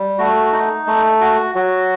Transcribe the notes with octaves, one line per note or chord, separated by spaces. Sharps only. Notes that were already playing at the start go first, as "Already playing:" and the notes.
Already playing: G3
A3 F#4
D#4
A3
F#4
F#3 F#4